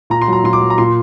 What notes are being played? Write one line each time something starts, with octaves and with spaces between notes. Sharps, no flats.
A#2 A#5
C6
F#3 A#5
A#2 C6
D6
F#3
A#5
A#2 C6